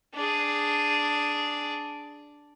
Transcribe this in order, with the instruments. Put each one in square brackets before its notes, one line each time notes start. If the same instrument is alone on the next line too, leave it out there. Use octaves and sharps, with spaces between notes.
[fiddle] D4 G#4